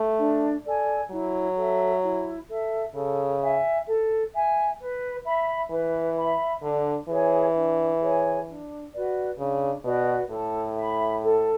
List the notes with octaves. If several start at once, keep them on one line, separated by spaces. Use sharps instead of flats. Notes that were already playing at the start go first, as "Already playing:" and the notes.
Already playing: A3
D4
A4 D5 G#5
F#3 E4
A4 E5
E4
A4 E5
C#3 A4
E5 G#5
A4
E5 G#5
B4
E5 B5
E3 B4
E5 B5
D3 D4
E3 G#4 C#5 G#5
D4
G#4 C#5 G#5
D4
F#4 B4 D5
C#3 D4
B2 F#4 B4 D5
A2 A4
E5 B5
A4